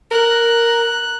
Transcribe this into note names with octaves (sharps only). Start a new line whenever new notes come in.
A#4 F#6